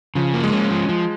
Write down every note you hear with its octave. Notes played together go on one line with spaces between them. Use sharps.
C#3 F3
A#3
G#3
C#4
F3
F3